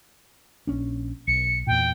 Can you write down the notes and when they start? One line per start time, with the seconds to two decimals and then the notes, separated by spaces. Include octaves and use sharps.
0.67 A#1 C#4 D4
1.27 B1 C#7
1.67 E2 A#2 G5